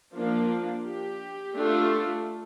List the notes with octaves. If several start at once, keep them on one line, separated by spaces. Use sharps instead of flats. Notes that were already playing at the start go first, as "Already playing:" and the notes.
F3 A#3 D4 F4
G4
A3 D4 F4